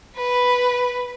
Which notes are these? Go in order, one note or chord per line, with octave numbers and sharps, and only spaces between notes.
B4